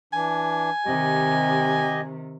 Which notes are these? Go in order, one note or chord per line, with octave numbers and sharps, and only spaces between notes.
E3 D4 G#5
C3 D#3 G4 D#5